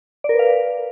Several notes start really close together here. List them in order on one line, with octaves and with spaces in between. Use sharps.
D5 A#4 B4 F5